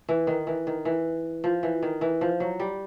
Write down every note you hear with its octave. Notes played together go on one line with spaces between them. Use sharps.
E3
D#3
E3
D#3
E3
F3
E3
D#3
E3
F3
F#3
G3